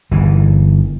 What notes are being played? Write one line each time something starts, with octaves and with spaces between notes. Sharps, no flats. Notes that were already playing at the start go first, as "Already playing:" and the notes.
G1 E3